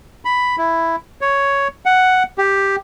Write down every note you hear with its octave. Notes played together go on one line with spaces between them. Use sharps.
B5
E4
C#5
F#5
G4